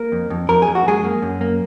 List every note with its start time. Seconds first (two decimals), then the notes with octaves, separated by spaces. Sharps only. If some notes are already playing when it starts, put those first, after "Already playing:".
Already playing: A#3 A#4
0.12 F2
0.30 F2
0.49 F2 A#4
0.62 G#4
0.67 F2
0.75 F#4
0.86 F#2 G#3 G#4
1.04 A#3
1.22 F#2
1.41 A#3